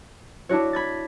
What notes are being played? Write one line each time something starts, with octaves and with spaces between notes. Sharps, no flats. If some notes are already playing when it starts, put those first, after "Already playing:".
D4 E4 F#4 C#5
B5 G#6 A6